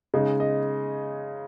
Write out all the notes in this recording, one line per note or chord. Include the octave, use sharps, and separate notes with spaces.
C#3 G#3 D#4
D#5